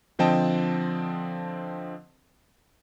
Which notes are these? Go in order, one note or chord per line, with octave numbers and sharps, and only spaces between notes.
D3 F3 C4 D#5 G5 A5